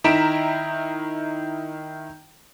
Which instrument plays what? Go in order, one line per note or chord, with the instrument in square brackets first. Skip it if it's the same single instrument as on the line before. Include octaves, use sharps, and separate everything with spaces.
[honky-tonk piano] D#3 E4 A#5 B6 D7 E7